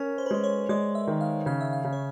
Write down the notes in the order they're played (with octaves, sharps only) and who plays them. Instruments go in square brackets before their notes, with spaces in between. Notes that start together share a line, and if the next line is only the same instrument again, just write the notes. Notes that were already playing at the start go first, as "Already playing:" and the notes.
Already playing: [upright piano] C#4 [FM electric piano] A#4
[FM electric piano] C5
B4
[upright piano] G#3 [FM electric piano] C5
[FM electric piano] C#5
[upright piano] G#3 [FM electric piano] D5
[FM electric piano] E5
[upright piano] D#3
[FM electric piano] F5
[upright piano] C#3 [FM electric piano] F5
[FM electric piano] E5
F5
[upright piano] C#3
[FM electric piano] C#5